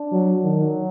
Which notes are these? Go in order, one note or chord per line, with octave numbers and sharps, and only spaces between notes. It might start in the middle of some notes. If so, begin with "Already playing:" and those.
Already playing: D4
F#3
D#3 F#3